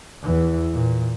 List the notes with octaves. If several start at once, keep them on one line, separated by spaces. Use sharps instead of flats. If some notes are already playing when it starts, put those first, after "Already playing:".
E2 E3
A#2